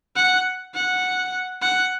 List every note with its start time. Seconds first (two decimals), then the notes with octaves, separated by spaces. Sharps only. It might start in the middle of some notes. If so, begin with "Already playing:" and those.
0.16 F#5
0.74 F#5
1.61 F#5